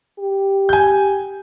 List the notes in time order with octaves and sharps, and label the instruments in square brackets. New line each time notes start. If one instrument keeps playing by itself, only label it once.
[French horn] G4
[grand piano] G#5 G6